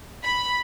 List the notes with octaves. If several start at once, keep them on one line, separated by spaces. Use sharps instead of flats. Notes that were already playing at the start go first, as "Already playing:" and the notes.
B5